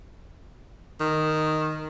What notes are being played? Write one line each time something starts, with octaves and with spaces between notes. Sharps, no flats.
D#3